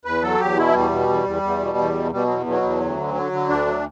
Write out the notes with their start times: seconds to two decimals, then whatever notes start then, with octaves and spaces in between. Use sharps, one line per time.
0.05 E2 B4
0.23 F#3 A4
0.40 E2 G4
0.56 B2 E4
0.68 F#3
0.73 E2 G3
0.91 B2
1.08 E2
1.25 E2
1.43 E2
1.60 B2
1.77 E2
1.94 B2
2.12 B2 G3
2.24 E2 F#3
2.46 B2 F#3
2.62 E2
2.80 D2
2.97 D3
3.14 D3
3.32 D3
3.48 D2 D4
3.66 F#3